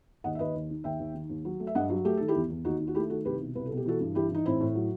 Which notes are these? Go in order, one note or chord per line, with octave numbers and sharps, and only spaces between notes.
D#2 D#5 F#5
E5
D#2 B4 D#5
D#2
D#3
D#2 E5 G5
D#2
D#3
D#2
F#3
A3
E5
G2 D#5 F#5
F#3
A3 G4
D#3 A4
E4 G4
E2
E2
D#2 D#4 F#4
D#3
F#4
A3 E4 G4
D#3 F#4 A4
C2 G4 B4
B2
C2 B4
A4
B2
G4
E3 F#4 A4
G2
E3 E4 G4
E3 D#4
A2 C4 E4
A2
F#3